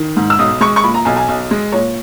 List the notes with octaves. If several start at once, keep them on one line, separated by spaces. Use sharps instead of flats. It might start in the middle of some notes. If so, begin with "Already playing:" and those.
Already playing: D#3
G#2
E6
B1 D#6
G#3 C#6
C#6
A#2 B5
A#5
B1 G#5
G#5
B1
G#3
A#2 C#5